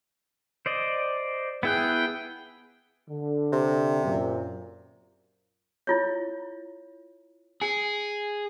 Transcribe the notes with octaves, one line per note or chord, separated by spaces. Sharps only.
C5 D5 D#5
B3 E4 G#4 G5 F#6
D3
C3
F#2 A#2
E4 F4 C#5
G#4 G#5